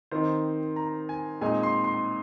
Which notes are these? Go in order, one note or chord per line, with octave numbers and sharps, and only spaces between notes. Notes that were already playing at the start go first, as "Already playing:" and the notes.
D#3 C4 D#4 C5
A#5
G#5
A#2 G#3 C4 D#4 G#5
C6
C6